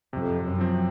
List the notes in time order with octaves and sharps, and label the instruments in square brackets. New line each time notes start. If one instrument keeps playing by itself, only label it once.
[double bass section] F2 [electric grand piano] C3
[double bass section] F#2
[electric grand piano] F3 C4